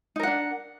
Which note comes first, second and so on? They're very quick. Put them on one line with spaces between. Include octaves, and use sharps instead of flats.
D#4 A#4 F#5 D4